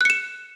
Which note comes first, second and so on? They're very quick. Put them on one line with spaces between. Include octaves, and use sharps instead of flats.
F#6 C#7 E7